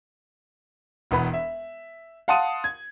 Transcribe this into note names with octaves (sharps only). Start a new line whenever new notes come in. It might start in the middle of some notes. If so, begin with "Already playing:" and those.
E1 E2 B3 B5
E5
F5 F#5 A5 C6 D#6 D#7
G#6